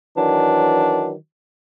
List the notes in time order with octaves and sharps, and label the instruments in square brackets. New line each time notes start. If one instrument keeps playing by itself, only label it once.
[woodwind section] D#3 E3 F#3 D4